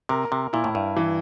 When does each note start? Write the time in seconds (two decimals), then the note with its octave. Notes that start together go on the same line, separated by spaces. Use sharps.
0.09 C3 A#4
0.32 C3
0.53 A#2 E4
0.64 A2
0.75 G2
0.96 E3